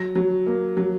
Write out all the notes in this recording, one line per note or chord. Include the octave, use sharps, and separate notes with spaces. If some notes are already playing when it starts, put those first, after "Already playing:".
Already playing: F#3 A#6
F#3
A#3
F#3